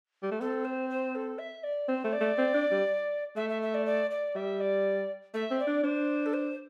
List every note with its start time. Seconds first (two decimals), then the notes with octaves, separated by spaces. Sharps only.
0.23 G3
0.31 A3
0.40 C4 A4
0.64 C5
0.89 C5
1.15 A4
1.38 E5
1.63 D5
1.88 C4 C5
2.04 A3
2.12 D5
2.21 A3
2.38 C4
2.54 D4
2.71 G3
3.36 A3 E5
3.49 E5
3.62 E5
3.74 D5
3.85 D5
4.10 D5
4.35 G3 E5
4.60 D5
5.33 A3 E5
5.50 C4
5.59 D5
5.67 D4
5.83 D4 C5
6.25 A4
6.33 C5